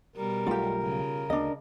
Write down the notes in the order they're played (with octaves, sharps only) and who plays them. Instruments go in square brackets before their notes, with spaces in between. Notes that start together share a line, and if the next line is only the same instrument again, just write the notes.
[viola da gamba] B2 G3 [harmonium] A#4
[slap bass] B1 A3 [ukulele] F4 G4
[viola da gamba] C#3
[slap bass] D2 [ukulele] D4 D#5